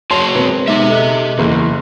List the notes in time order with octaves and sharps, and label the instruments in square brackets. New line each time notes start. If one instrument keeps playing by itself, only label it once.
[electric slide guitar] F#4 G#4 C#5 [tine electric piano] A5 [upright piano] C6
[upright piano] E1 [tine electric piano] C4 B4
[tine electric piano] G#3 B3 D#4 [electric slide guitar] G4 E5
[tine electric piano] A4 D#5 F#6
[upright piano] F#1 [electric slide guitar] E2